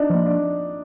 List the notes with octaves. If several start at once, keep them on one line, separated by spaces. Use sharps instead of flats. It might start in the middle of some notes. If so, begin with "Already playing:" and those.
Already playing: D4 D#4
F3 A#3
D4